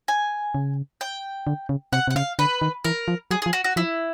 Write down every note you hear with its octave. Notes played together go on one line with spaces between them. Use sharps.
G#5
C#3
G5
D3
C#3
C3 F#5
C3
F#5
C#3 F5
D3 B4
D#3
E3 A#4
F3
F#3 G#4
G#4
F3
F#4
F#4
F3 E4